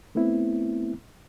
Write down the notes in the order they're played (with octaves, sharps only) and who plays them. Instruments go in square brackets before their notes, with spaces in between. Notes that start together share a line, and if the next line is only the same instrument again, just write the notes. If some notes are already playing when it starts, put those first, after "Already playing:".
[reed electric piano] A3 B3 C4 E4